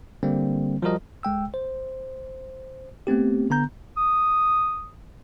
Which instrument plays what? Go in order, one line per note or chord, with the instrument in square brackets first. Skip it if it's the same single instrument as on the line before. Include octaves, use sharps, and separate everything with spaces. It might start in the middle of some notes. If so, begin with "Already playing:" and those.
[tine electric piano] D3 G3 A#3 C4
F3 G3 F#4 A#4 D#5
B1 G#3 G5 E6
C5
A3 B3 C4 G4
D3 B3 A#5 G6
[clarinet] D#6